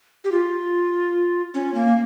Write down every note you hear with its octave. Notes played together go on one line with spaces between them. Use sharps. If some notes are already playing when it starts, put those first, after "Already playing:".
G4
F4
C#4
A#3